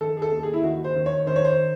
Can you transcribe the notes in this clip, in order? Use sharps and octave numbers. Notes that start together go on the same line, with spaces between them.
D#3 A4
G#4
A4
D#2
G#4
E4
D#3 F#4
C5
D#3
C#5
D#3 C5
C#5
C5